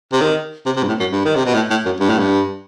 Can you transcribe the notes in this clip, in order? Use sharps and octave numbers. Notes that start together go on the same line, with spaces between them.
C3
D#3
C3
C3
G2
A2
F#2
G2
D#3
C3
B2
A2
A2
F#2
G2
A2
G2